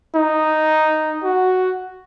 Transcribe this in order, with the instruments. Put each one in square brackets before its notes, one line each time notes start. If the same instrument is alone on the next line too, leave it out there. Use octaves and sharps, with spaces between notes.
[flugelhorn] D#4
F#4